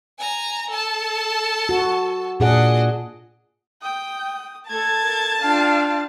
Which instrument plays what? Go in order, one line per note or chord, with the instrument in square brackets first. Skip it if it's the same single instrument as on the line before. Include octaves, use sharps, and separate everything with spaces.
[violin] G#5 A#5
A4 A5
[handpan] F#4
[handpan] A#2 G#4 F#5 [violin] D4 D#5
[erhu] G5 [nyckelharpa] D#6
[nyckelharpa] A3 A4 [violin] A5 A6 [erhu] G#6
[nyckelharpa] A4 A#4
[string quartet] D4 F4 [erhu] F5 [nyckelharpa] G5